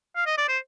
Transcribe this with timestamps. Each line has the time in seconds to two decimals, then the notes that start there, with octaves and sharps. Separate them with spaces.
0.16 F5
0.26 D#5
0.38 D5
0.48 C5